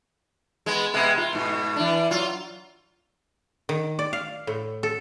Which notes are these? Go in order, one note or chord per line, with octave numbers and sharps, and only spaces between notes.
G#3 B3
C3 G#3 B3
F4
G#2 B2
E3 D4
F#3 F4
D#3
D5
F5
A2
A4